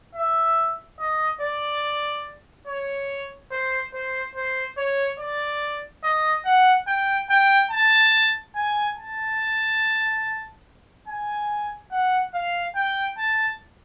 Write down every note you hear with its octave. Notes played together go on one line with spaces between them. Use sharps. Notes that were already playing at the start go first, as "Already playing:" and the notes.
E5
D#5
D5
C#5
C5
C5
C5
C#5
D5
D#5
F#5
G5
G5
A5
G#5
A5
G#5
F#5
F5
G5
A5